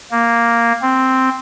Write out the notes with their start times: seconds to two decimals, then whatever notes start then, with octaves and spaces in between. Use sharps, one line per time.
0.11 A#3
0.82 C4